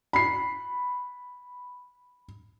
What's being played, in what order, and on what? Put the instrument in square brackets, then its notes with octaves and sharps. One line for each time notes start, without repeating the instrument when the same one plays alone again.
[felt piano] B5 C7